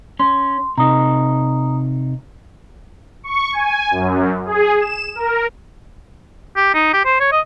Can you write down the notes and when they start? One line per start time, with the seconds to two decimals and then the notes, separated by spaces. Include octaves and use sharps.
0.19 C#4 C6
0.77 C3 D#4 A#5 D#6
3.23 C#6
3.53 G#5
3.91 F#2
4.46 G#4
4.80 E7
5.15 A#4
6.57 G4
6.74 D#4
6.93 G4
7.05 C5
7.20 C#5
7.32 D#5